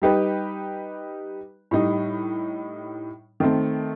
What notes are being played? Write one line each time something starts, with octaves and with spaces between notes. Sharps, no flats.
G3 D#4 G4 B4
A2 G3 D#4
D#3 A3 C4